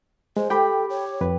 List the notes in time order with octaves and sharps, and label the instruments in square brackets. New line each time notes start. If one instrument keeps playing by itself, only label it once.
[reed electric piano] G#3 [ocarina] C5
[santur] G4 [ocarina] A4 [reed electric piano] G5 B5
[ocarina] C#5
[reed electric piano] F2 B4